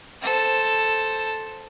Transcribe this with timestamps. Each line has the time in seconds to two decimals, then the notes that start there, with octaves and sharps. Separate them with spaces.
0.22 A4 C5